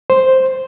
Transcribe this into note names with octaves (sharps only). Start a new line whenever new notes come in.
C5